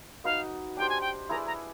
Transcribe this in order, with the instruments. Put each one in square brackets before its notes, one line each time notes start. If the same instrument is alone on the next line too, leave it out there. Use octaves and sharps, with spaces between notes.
[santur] D#4 F#4 B4 D#5 [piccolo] F5
[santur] D4 G4 C5 [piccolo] G5
[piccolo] G#5
G5
[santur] E4 G#4 B4 D5 [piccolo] A#5
[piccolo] A#5